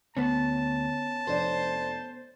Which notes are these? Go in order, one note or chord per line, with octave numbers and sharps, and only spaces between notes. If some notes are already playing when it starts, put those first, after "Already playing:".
D2 B3 C#4 A5
F1 D4 C5 D5